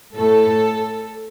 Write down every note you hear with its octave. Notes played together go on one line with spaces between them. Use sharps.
A2 A3 A4